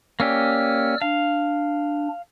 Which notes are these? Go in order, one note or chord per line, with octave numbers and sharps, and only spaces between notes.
A#3 C#4 G4 D5 E6 F6
D4 F5